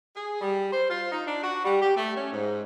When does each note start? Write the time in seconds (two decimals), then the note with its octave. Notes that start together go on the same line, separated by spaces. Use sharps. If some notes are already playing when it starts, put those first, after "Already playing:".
0.16 G#4
0.41 G3
0.73 C5
0.90 F4
1.11 D#4
1.26 D4
1.42 F#4
1.64 G3
1.81 G4
1.96 A3
2.15 C#4
2.33 G#2